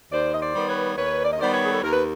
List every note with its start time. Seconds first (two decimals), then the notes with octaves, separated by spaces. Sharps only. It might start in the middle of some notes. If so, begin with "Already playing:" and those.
0.12 D#2 C5 D5
0.34 D#5
0.41 C5 D5
0.54 D#3 G3 B3
0.69 B4 C#5
0.96 D#2 B4 C#5
1.25 D5
1.33 D#5
1.38 D#3 G3 B3 C5 D5
1.53 B4 C#5
1.65 G#4
1.73 A4
1.81 D#2 A#4
1.92 B4